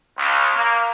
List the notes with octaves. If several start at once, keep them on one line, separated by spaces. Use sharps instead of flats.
C#2
A#3